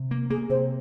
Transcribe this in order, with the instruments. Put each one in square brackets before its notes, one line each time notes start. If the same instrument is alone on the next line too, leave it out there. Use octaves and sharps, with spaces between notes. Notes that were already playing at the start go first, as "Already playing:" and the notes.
Already playing: [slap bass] C3
A#3
[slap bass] A#3 [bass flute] G#4
[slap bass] C3 [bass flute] C5